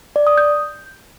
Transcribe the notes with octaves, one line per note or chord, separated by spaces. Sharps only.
D5
D#6
G6